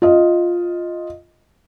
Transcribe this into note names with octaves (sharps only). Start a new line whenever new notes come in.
F4 D#5